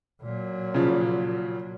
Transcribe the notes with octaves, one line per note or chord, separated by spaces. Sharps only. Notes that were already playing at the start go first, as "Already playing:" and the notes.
A#2 F#3
C#3 F3